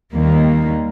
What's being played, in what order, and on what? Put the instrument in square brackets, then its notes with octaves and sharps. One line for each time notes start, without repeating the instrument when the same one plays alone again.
[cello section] D#2 D#3 G3 A#3